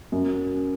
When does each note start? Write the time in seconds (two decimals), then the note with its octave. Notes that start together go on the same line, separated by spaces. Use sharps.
0.12 F#2